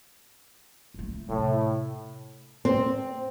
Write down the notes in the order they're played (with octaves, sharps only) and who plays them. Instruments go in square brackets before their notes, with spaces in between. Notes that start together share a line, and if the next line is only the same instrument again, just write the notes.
[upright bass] D3 A3
[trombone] A2 [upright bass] C3
[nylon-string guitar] C4